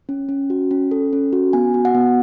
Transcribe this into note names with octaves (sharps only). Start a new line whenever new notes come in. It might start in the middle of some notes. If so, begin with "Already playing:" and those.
C#4
C#4
F#4
C#4
A4
C#4
F#4
B3 G#5
F#4
F#5
B3